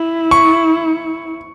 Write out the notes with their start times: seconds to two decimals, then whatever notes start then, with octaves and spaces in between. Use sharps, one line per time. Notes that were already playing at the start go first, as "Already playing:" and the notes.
Already playing: E4
0.31 C#6